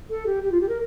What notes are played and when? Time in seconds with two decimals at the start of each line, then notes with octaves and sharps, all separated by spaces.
0.10 A4
0.26 G4
0.43 G4
0.52 F4
0.61 G4
0.68 A#4